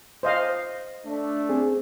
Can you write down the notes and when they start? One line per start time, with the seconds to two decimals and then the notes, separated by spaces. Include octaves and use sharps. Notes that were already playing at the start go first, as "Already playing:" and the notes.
0.23 C5 D#5 F5
1.06 A3 D4
1.49 C4 G#4